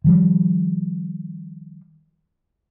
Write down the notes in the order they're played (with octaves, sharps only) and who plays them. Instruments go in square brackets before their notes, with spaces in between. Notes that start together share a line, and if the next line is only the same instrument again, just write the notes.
[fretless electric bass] D#3 F3 G3